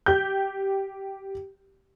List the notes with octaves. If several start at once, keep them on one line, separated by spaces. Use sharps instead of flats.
G4 G6